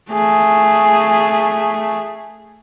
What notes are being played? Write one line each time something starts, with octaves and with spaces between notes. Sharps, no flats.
A3 G#4